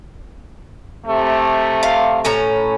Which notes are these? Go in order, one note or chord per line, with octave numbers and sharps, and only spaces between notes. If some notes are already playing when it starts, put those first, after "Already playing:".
C3 A3
F5
A2 C#4 A#5